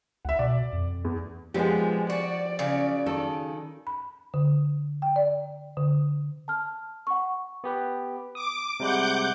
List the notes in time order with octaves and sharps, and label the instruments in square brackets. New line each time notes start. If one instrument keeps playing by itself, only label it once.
[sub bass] C#2 [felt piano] E5 F#5
[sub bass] B2 [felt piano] D5
[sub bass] F2
[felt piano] E2
[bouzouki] A#2 D4 F4 [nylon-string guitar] F3 B3 G4 [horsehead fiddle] G#3
[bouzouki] F#4 [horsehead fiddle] D5
[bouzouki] C#3 F#3 C#4
[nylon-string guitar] D#3 A4
[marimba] B5
D3
G5
D5
D3
[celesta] A5 F6
F#5 C#6
[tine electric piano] B3 G4 B4
[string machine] D6 [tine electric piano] D#6
[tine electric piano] C3 G3 G#3 [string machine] F#5 D6 G6